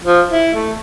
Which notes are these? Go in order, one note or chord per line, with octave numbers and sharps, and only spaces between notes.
F3
E4
A3